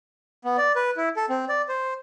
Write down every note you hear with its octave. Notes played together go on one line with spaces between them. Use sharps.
B3
D5
B4
E4
A4
C4
D5
C5